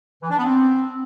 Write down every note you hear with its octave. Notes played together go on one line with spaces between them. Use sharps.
E3
D4
B3
C4